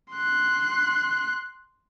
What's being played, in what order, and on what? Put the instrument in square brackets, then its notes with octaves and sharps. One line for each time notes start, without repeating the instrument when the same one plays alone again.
[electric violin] C6 F#6